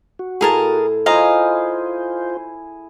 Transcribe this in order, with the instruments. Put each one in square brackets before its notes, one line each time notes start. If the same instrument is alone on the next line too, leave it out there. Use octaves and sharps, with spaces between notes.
[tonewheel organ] F#4
[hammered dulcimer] A2 E4 [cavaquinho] G#4 A#4 A5
[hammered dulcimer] E4 G#4 [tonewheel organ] F4 C5 [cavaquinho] D#5 F5 A#5